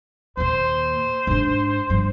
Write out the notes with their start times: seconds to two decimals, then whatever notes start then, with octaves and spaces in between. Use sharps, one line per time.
0.37 D#2 A#2 C5
1.27 G#2 D4
1.90 G2 F3